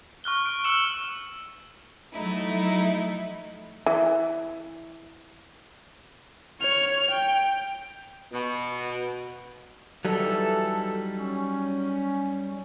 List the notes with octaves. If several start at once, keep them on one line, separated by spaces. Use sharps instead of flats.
C#6 F6 F#6 G7
D7
E6 F6 C#7 E7
F3 F#3 A3 D#4 E4
E3
C#5 F6
G5
B2
E3 F#3 G3 D#4 A4
C#4